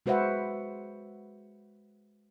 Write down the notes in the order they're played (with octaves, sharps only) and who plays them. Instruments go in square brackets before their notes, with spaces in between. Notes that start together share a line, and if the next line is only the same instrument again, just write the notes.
[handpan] G#3 F#4 B4 C5 E5 F#5